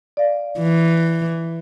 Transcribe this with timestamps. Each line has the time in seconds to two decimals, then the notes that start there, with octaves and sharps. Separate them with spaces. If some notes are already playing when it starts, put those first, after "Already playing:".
0.17 D5 F5
0.59 E3